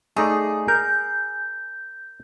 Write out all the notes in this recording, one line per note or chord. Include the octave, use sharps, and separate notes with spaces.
A3 D#4 G#4 D5
A#4 G6